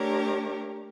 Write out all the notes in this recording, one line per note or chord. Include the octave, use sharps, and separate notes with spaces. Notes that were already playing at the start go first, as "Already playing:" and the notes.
Already playing: A3 D4 G4 A#4 C#5